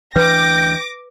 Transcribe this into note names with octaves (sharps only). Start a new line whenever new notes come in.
D2 E3 D4 B4 G5 D6 A#6